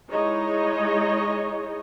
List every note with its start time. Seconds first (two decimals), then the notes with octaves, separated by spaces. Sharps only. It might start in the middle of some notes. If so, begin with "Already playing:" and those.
0.11 G#3 D#4 E4 G#4 C#5 D#5